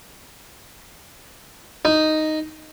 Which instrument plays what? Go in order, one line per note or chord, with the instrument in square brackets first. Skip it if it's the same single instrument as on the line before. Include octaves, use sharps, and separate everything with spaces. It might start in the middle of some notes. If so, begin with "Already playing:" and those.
[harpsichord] D#4